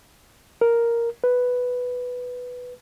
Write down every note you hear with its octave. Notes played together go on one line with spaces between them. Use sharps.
A#4
B4